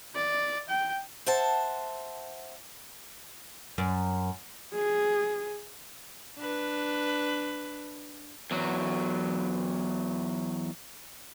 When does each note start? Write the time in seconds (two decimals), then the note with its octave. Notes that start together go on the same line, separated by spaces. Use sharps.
0.15 D5
0.69 G5
1.26 C5 E5 F#5 A5
3.78 F#2
4.74 G#4
6.38 D4 B4
8.51 E2 F#3